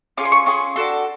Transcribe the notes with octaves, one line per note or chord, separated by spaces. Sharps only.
C#4 F4 G#4 D6
C6
C#6
C#4 F4 G#4 C#6
D4 F#4 A4 C6